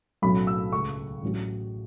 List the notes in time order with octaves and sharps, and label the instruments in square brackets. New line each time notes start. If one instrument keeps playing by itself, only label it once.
[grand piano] B1 A2 F#3 A3 C#4 B5
E6
C#2 C#3 A3 C#6
A1 A2 F#3 C#4